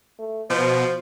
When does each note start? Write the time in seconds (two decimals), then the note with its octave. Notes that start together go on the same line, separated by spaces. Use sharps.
0.19 A3
0.50 B2 F3 C5